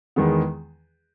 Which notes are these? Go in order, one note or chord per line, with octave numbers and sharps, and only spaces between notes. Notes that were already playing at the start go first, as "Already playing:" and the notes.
E2 D#3 G#3 B3